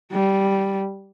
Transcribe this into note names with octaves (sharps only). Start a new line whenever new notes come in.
G3